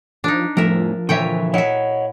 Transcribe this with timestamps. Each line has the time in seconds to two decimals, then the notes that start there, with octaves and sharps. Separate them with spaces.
0.24 F3 D4 D#4
0.57 F2 A2 F3 A#4 E5
1.09 A#2 D3 E3 C#5 E5 G5
1.54 E4 C#5 D#5 E5 F#5